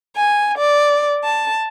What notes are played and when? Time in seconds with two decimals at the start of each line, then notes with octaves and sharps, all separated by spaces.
0.17 G#5
0.57 D5
1.25 A5